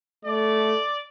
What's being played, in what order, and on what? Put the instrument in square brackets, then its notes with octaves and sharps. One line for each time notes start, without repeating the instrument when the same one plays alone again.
[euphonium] A3 [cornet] D5